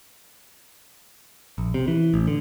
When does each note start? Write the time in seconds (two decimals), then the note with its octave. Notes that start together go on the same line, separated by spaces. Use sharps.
1.58 A#1
1.74 C3
1.88 E3
2.14 A1
2.27 D3